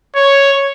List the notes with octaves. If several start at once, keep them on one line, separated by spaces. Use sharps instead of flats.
C#5